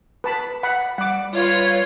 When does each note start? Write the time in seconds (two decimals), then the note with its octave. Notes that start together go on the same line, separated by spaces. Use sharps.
0.24 B4 A5 B5
0.63 F#5 B5
0.98 G3 F#5 D6
1.34 F4 B4 C#5